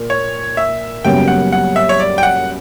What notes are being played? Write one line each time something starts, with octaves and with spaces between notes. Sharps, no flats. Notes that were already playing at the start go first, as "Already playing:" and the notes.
Already playing: A#2 A#3
C#5
E5
F#1 F#2 C#3 G3 B3 G5
F#5
F#5
E5
C#5
D5
G5
F#5